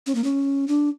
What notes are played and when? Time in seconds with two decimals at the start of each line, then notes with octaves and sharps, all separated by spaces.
0.06 C#4
0.15 A#3
0.24 C#4
0.68 D4